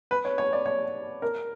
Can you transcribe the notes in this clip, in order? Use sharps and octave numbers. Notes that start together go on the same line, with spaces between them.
B4
C#5
C#5
D5
C#5
A#4